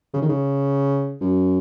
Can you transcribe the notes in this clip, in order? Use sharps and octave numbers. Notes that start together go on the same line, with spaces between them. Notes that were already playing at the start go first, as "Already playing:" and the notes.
C#3
D#3
C#3
F#2